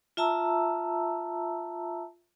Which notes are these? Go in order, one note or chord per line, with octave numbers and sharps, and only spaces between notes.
F4 E5 A5 A#5 E6